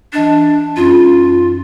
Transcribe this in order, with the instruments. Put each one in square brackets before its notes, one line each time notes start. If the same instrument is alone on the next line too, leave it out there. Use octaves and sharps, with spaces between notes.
[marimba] E3 D#5 A6 [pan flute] D4
[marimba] F#2 C#4 D#4 [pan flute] F4